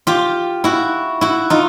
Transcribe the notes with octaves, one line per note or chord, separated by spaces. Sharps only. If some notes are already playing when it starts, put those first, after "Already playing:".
F4 G4
E4 F#4
E4 F#4
D#4 F4